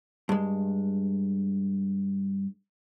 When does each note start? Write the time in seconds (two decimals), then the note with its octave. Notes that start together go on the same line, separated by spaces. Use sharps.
0.29 G2 G#3